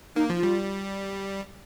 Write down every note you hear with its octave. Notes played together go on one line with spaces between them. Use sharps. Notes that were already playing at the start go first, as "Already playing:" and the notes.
A#3 D#4
F3
F4
G3